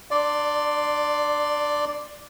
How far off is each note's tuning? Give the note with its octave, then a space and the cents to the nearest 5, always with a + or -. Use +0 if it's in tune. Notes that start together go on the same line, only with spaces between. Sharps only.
D4 +25 D5 +0 C6 +0